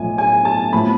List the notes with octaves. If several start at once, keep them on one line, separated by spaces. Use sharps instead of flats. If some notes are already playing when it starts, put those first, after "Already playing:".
Already playing: B1 A2 F3 A3 G#5
G#5
A5
A2 F3 B3 B5